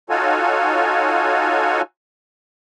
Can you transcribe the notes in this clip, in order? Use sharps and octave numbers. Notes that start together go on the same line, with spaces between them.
D#4 F4 F#4 A4 C#5 G#5